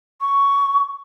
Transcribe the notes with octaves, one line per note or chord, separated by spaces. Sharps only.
C#6